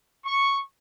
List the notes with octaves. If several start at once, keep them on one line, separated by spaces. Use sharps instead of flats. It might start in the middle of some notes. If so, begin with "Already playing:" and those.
C#6